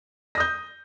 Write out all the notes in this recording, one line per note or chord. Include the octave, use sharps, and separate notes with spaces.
D#6 G6 A#6